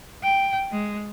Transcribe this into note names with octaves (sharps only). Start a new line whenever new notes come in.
G5
G#3